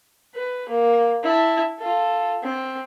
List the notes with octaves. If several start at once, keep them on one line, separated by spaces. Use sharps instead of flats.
B4
A#3
E4 A5
F4 A4
C4